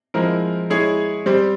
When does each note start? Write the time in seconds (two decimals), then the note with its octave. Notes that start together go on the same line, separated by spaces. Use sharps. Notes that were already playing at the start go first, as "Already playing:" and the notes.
0.14 F3 G#3 C4 E4 A#4
0.70 G#3 E4 G#4 C#5
1.26 G3 C4 G4 C5